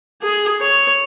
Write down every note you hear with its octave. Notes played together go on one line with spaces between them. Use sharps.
G#4
C#5